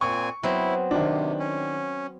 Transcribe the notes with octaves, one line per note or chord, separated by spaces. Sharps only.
A#2 C4 G#5 C#6
F#3 B3 C4 E4
C3 D#3 D4
C#4